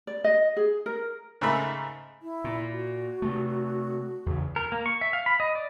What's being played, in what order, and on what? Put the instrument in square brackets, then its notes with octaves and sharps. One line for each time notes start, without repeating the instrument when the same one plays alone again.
[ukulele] D5
D#5
G#4
A#4
[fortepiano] G#2 C#3 A3 A#4 E5 B5
[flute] E4
[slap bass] A#2
[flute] F#4
[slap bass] C3 A3
E2 C#3
[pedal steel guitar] A#4
A#3
C#6
E5
F5
B5
D#5
D5